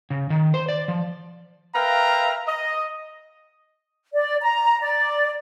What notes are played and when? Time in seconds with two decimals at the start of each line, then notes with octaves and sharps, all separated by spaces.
0.10 C#3
0.30 D#3
0.54 C5
0.69 D5
0.88 F3
1.75 A#4 B4 E5 F5 G5 A#5
2.48 D#5
4.14 D5
4.41 A#5
4.81 D5